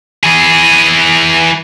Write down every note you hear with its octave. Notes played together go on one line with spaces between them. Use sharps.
E3 G#4